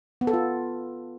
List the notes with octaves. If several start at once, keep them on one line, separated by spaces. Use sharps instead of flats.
B3
A4
F4